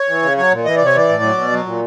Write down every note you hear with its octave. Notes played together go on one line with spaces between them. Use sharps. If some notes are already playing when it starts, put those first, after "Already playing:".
Already playing: C#5
E3
C#3
F#3 C#5
A#2
E3 D#5
C3 D5
C#5
E3 D5
A2
F#3
B2
F#3
A#2